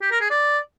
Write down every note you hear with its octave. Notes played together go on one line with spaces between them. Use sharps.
G4
A#4
G#4
D5